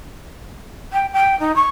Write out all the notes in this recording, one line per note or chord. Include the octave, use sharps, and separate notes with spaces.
G5
G5
D#4
C#6